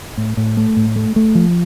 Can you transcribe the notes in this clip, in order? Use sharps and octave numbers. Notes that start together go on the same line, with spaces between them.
A2
A2
A3
A2
A3
A3
F3